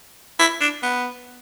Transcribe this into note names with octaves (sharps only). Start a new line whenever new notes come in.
E4
D4
B3